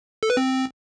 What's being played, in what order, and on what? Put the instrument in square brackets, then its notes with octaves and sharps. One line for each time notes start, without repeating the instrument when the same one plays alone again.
[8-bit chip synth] A4
B4
C4